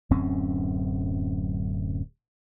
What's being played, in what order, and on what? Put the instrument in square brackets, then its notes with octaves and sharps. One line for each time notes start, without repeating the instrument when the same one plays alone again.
[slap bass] D1 F#2 C4 C#4